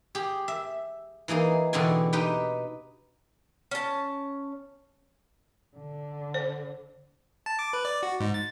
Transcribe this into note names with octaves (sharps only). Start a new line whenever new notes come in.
G4 G#4
E5
E3 A#3 D#4 G#4
E2 B2 D3 C4 G#5
D#4 G4 B4 G5
C#4 A5
D3
C5
A5
D6
B4
D5
F#4
G#2
A6